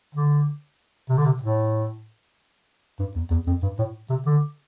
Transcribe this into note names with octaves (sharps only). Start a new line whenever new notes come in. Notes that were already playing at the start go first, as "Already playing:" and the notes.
D3
C3
D3
C3
A2
G2
E2
E2
F2
G2
A2
C3
D3